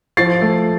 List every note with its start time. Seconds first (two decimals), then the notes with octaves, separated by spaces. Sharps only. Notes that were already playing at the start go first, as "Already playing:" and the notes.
0.17 F3 A6 C7
0.42 A3